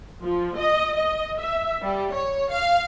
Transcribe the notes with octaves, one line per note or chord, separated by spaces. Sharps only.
F3
D#5
D#5
E5
G3
C#5
F5